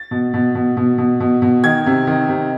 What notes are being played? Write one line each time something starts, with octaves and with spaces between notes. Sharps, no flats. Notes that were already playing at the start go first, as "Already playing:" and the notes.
Already playing: A6
B2
B2
B2
B2
B2
B2
B2
D#3 G#6
C3
D#3
C3